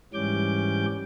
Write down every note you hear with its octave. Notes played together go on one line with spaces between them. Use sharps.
G#2 E3 G3 C#4 D6 G6